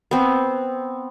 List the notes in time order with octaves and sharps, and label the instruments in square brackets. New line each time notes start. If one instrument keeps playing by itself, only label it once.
[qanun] B3 C4